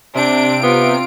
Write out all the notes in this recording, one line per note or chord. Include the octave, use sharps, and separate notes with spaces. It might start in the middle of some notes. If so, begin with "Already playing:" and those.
C3 D4 D7
B3 F4